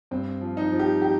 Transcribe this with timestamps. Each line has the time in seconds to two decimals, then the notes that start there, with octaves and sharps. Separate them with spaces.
0.11 G2 C4
0.41 F3
0.57 D#4
0.72 F3
0.79 G4
1.02 G4